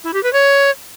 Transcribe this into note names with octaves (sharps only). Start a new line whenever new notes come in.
E4
G4
B4
C#5